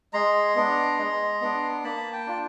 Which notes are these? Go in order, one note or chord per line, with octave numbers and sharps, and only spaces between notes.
G#3 A#5 C6
B3 D4
G#3
B3 D4
A#3 A5 B5
G5 A5
D4 F4